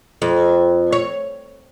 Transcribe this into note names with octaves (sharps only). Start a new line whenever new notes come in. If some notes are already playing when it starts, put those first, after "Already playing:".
F2
C#5